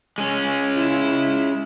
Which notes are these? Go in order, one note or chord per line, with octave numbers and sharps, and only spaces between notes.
G#3 C#4
E4